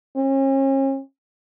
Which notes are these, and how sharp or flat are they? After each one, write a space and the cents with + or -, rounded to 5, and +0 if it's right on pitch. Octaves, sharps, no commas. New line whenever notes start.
C#4 -40